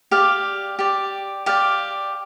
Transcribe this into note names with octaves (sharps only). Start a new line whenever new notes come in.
G4 D5 F5
G4 D5
G4 D5 F5